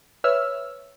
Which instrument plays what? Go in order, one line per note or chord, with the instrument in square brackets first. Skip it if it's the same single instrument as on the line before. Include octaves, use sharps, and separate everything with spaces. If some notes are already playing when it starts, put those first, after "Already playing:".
[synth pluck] B4 C#5 E5 E6 F6